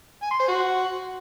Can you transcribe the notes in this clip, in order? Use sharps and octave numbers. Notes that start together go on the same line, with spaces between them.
G#5
C6
C5
F#4